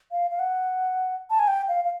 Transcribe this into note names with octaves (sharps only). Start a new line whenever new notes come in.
F5
F5
F#5
A5
G#5
G5
F5
F5